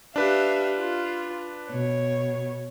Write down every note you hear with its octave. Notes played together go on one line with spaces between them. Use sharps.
D4 G4 B4 E5 F5
F4
B2 C#5